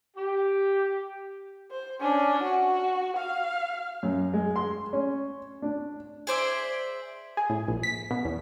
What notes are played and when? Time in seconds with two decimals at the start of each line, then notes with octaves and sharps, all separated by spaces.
0.17 G4
1.71 C5
2.00 C#4 D4
2.43 F#4
3.16 F5
4.03 F#2
4.34 G#3
4.56 C6
4.93 C#4
5.62 D4
6.27 G#4 C5 D5 E5
7.37 G#4
7.50 A2
7.68 A#1
7.83 B6
8.11 B2
8.25 E2